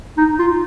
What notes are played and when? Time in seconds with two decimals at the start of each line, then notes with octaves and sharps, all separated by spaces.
0.17 D#4
0.39 F4